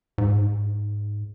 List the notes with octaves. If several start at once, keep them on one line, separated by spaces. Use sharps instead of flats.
G#2